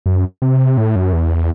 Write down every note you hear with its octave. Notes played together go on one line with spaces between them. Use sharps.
F#2
C3
A2
F#2
E2